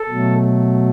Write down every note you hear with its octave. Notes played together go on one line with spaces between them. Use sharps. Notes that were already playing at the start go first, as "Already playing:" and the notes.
Already playing: A4
B2 F#3 A3